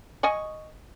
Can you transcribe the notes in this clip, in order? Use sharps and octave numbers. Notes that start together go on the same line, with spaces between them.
D#5 G#5 C#6